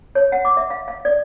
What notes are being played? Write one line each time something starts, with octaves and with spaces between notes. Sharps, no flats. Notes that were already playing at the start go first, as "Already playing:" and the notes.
C#5
F#5
D6
E5
F5
F5
D5